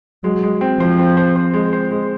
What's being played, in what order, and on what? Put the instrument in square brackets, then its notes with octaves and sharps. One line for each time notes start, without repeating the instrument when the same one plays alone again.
[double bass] F#3 [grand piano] G#3
[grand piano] G#3
C4
[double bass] F3 [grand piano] C5
[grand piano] C4
C5
C5
G#3
C5
G#3